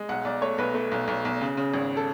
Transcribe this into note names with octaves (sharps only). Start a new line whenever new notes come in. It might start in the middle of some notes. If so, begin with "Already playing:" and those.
Already playing: G#3
B1 F#5
B1 D5
A3 C#5
B1 B4
A3
B1
B1
B1
C#3
C#3
G#1
A4